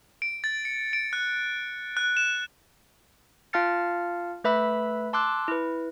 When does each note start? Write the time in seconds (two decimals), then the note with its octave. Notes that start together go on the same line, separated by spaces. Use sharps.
0.22 D7
0.44 A6
0.65 C#7
0.93 D7
1.13 F#6
1.97 F#6
2.17 E7
3.53 F4 F5 A5 F6 A6 C#7
4.44 A3 B4 E5 B5 E6
5.13 A5 C6 D6 E6 F#6
5.48 E4 B4